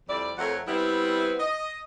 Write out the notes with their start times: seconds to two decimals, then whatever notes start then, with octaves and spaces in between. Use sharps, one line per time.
0.07 F2 G3 E4 D5
0.38 F2 A3 A#4 C#5 F#5
0.67 G3 B3 C4 E4
1.40 D#5